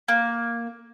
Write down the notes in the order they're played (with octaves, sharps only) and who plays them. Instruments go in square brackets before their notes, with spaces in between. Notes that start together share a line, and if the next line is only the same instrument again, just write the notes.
[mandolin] A#3